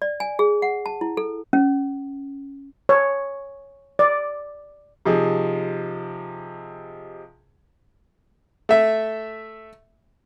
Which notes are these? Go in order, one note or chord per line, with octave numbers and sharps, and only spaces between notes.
D5
G#5
G#4
F#5
A5
E4
A4
C#4
C#5
D5
C3 F3 D#4 G#4
A3 E5